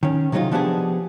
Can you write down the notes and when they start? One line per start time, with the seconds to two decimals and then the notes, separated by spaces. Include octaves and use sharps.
0.03 D#3 C#4
0.32 C3 F#3 G#3 B3 D#4 F4
0.51 F3 B3 D4 F4 G4 G#4